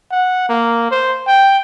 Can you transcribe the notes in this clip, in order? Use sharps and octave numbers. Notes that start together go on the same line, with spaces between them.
F#5
A#3
C5
G5